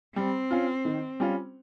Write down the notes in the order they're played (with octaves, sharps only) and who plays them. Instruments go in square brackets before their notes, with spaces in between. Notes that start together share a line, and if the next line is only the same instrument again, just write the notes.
[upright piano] G3 [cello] C4
[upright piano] C#4 F4
D#3
G3 C#4 F4